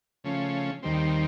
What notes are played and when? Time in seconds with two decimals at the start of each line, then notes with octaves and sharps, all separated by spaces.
0.24 C#3 F3 A3 C#4
0.83 D#2 D#3 G3 C4